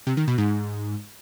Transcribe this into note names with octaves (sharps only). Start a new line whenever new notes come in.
C3
D#3
B2
G#2